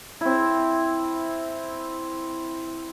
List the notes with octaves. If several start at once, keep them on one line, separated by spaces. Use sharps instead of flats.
C4 E4